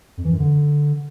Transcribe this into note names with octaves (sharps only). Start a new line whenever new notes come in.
F2
E3
F#2
D3